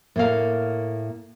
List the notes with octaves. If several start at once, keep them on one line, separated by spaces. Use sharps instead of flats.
A2 A#3 F5